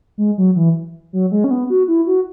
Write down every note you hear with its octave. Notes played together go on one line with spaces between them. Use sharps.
G#3
F#3
E3
F#3
G#3
C#4
B3
F#4
E4
F#4